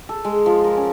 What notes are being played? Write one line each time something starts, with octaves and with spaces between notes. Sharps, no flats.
A4
G#3
F3
A#4
C#4